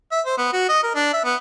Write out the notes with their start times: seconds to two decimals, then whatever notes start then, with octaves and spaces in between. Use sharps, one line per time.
0.11 E5
0.26 C5
0.38 B3
0.53 F#4
0.69 D#5
0.83 A#4
0.95 D4
1.13 E5
1.25 B3